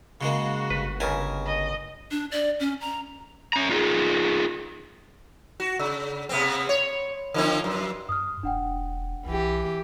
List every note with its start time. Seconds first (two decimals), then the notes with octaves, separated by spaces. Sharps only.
0.21 C#3 G#3 A#3 F#4
0.70 G1 B4
1.00 C#2 C#3 A#4 G#5 A5
1.45 D#5
2.11 D4
2.31 D5
2.60 C#4
2.81 A#5
3.53 C#4 A#5
3.69 D#4 F4 G#4
5.60 F#4
5.79 C#3
6.29 C3 B3 C4
6.69 C#5
7.34 D3 F3 C4
7.64 F#2
8.09 G2 D#6 F6
8.43 E1 D4 F#5 G5
9.26 B1 E3 G4